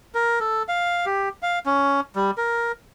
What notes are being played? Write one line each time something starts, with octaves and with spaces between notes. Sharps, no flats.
A#4
A4
F5
G4
F5
C#4
G3
A#4